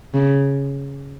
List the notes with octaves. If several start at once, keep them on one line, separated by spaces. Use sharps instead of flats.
C#3